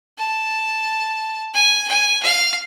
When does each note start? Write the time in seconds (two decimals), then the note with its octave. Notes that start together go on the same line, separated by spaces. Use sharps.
0.18 A5
1.54 G#5
1.88 G#5
2.23 F5